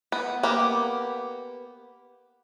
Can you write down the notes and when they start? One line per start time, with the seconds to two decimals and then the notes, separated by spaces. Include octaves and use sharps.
0.12 B3
0.43 A#3 B3 G4